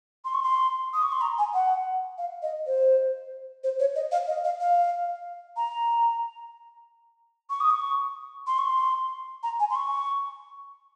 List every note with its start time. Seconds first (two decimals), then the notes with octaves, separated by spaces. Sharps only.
0.25 C6
0.34 C#6
0.43 C6
0.94 D#6
1.03 C#6
1.12 C6
1.21 A#5
1.38 G#5
1.54 F#5
2.18 F5
2.42 D#5
2.67 C5
3.64 C5
3.80 C#5
3.96 D#5
4.12 F5
4.28 D#5
4.44 F5
4.60 F5
5.57 A#5
7.50 C#6
7.61 D#6
7.70 C#6
8.47 C6
8.58 C#6
8.69 C6
9.43 A#5
9.60 G#5
9.70 C6
9.76 C#6